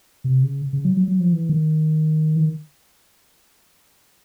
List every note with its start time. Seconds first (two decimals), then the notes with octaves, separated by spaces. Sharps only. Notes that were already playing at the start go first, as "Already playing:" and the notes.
0.24 C3
0.43 C#3
0.73 C#3
0.85 F#3
0.97 F#3
1.08 F#3
1.20 F3
1.33 E3
1.49 D#3
2.36 E3
2.40 D#3